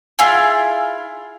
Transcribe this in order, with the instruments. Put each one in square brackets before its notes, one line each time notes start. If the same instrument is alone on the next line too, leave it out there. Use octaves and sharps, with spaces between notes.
[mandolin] E4 F4 G#4